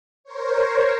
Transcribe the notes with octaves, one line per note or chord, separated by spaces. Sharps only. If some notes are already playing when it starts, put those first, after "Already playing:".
A#4 C5 C#5